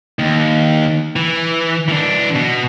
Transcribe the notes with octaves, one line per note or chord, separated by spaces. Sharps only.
D#2
E3
E3 D4
B2